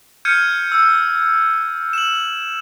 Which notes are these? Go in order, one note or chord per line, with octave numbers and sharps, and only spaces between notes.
F6 G6 G#6 C#7 D#7
E6
E7 F#7